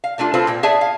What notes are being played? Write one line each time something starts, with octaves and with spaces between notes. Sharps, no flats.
F5
G3 A3 D4 F4 A4
C4 F4 G#4 A4 B4 C5
A#2 G5
B3 G#4 D5 E5 A5
F5